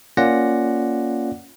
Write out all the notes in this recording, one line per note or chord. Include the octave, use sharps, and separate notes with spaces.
A#3 C#4 F4 D5 F#5 A#6